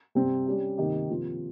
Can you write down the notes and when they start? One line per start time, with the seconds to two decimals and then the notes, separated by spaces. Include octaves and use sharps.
0.15 C3 G3 C4
0.47 G3 C#4 G4
0.77 C3 D#3 A#3 D#4 G4
1.10 C3 F3 A#3 F4